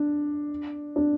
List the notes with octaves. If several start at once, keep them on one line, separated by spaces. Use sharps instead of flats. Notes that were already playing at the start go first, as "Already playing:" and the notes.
Already playing: D4
D4